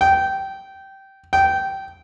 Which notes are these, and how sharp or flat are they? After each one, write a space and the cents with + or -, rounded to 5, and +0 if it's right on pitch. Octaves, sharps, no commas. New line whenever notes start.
G5 -15
G5 -15